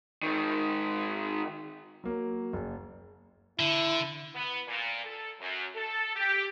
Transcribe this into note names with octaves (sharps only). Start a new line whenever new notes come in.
G#2 D#3
F#3 A#3
F#1
D3 E4
B3
A#2
A4
F#2
A4
G4